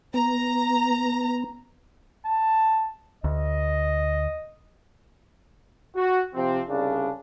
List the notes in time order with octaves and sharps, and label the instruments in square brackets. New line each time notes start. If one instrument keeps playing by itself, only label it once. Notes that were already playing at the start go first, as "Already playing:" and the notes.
[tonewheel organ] B3 [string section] A#5
[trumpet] A5
[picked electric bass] D2 [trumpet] D#5
[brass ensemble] F#4
C3 F3 C4
C2 C#3 D4